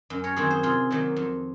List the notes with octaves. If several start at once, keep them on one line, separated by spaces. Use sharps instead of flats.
F#2
A#4 C#5
D#3 F#3 C4 G#4 C5
G#4 C5
C3 F4 G#4
D#3 F#3 A#3
F2